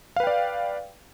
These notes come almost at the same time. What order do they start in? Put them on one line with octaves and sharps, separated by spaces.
F5 B4 G5 D5